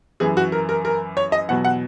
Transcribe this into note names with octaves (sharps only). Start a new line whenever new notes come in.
F#2 E3 G#4
F#4
A#4
A#4
A#4
C#5
D#5
E2 B2 F#3 F#5
F#5